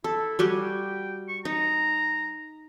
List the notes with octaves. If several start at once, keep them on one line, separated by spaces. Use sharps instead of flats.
E4 A4
G3 F#4 G4 G#5
G5
C#6
D#4 A#5